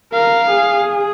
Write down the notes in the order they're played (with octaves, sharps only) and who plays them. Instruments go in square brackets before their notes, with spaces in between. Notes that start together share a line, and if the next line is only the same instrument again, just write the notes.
[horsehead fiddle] A#4 [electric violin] F5
[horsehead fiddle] G#4